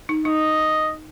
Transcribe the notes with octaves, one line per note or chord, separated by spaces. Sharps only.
D#4
D#4 D#5